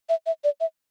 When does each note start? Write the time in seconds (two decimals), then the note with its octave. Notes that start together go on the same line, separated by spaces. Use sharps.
0.09 E5
0.26 E5
0.44 D5
0.60 E5